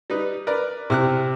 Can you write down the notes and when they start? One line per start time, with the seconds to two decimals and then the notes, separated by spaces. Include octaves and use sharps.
0.10 G3 D#4 B4
0.47 A#4 B4 D5
0.90 C3 E4 F6 F#6